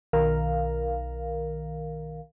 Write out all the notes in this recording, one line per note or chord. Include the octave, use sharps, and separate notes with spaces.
B1 D#3 A#4 F5